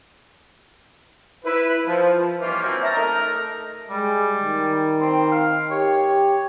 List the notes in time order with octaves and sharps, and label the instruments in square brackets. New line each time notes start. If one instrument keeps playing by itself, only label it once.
[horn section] E4 B4
F3
[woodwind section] D#3 E3 G3 A#3 C#4 F4
F#3 A#3 C4 C#4
E5 A5 A#5
A3 D#4 A#4
[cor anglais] G3 [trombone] G#3
[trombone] D#3
[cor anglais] C4
F5
[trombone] G4 [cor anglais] C#5